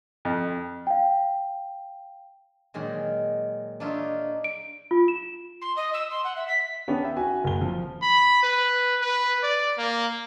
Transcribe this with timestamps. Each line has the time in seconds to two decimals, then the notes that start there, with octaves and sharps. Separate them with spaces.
0.25 F2
0.87 F5 G5
2.74 A#2 D#3 F#3 G#3
3.80 D4 D#4 F4 C#5 E5
4.44 D7
4.91 F4
5.08 E7
5.61 C6
5.76 D#5
5.93 E6
6.10 C6
6.24 F#5
6.36 E5
6.47 B6
6.88 D#3 B3 C#4 D4
7.03 E5 G5
7.17 F#4 G#5
7.44 F#1 G7
7.61 F3
8.02 B5
8.43 B4
9.02 B4
9.43 D5
9.78 A#3